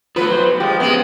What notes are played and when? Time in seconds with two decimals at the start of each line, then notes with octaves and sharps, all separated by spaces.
0.16 F3 F#3 A3 B4
0.29 B1 C5
0.60 F3 G#3 G4
0.80 C#3 G#3 B3 C4